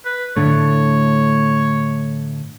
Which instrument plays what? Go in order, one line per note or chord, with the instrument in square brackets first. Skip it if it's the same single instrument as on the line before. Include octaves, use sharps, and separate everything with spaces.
[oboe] B4
[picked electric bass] A2 D3 A3 [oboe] C#5